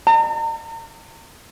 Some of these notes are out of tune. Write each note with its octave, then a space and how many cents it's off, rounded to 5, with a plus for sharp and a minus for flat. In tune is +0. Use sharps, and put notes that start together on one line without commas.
A#5 -40